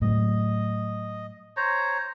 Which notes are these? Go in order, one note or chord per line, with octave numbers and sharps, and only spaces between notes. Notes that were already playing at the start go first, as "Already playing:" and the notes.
A2 F#3 D#5
C5 C#5 A#5